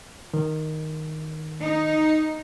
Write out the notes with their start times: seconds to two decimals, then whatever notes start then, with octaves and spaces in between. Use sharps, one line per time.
0.34 D#3
1.61 D#4